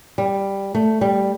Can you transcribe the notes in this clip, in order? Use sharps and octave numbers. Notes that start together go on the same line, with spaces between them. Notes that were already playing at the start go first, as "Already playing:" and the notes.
G3
A3
G3